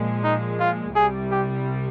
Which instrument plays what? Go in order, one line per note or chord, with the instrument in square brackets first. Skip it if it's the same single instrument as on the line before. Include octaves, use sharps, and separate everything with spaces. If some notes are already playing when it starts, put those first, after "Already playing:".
Already playing: [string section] A#2 F3 G#3
[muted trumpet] D#4
F4
[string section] C2 C3 G3 [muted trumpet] G#4
[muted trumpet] G4